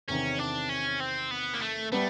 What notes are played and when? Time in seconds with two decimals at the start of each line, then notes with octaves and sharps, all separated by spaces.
0.08 E2 C3 D#3 C#4
0.39 D4
0.69 C#4
1.00 C4
1.31 B3
1.54 A#3
1.62 A3
1.92 G3 A3 B3